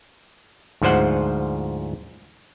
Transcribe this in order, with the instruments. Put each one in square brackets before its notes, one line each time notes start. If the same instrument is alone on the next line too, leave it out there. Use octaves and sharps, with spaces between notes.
[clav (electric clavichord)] D2 G#2 F3 C5 F#5